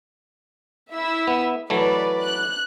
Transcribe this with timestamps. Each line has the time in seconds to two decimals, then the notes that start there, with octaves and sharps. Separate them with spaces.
0.92 E4 E5 E6
1.27 B3
1.70 E3 F#3 A3 B4 D5
2.22 F#6